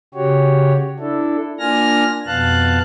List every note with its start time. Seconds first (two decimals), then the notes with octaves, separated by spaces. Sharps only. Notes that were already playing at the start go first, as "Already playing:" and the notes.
0.14 C#3 F#4 G4 C#5
0.99 D4 E4 A4
1.59 A#3 D4 F4 G#5 F6 A#6
2.27 F2 B2 B3 F5 A5 F#6